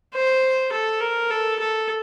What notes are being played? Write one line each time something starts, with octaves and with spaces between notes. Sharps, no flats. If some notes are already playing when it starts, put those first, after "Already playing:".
C5
A4
A#4
A4
A4